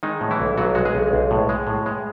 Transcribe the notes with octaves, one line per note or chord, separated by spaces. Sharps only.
D#3 G#3 D#4
A2
E3 E4
B1
B1 F#3 F#4
G#3 F#4
G#3 G#4
B1
B1
A2
G#3
A2
G#3